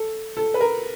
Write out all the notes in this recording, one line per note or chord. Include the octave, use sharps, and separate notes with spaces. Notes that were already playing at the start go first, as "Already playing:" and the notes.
Already playing: A4
A4
B4
A#4